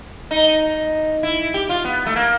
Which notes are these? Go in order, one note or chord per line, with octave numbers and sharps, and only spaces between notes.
D#4
E4
G4
F4
B3
A3
A#3